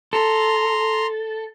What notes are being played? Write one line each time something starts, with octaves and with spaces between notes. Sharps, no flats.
A4 A#5 C6